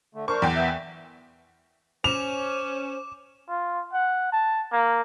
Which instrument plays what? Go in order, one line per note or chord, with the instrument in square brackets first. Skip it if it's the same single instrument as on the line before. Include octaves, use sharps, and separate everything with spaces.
[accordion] D3 A3
[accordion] D4 A#4 C5 [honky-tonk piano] C#6
[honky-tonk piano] E2 G5
[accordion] B3 E5
[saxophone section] C#4 [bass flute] C5 [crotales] D6 E7 [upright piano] F7
[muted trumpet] F4
F#5
A5
A#3